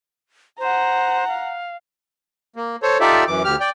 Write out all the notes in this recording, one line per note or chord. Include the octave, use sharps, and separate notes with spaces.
C5 F#5 A#5
F5
A#3
A4 C5 C#5
D#4 F4 G4 A4 D5 E5
F#2 E3 D6
D2 G4 F6
D5 G5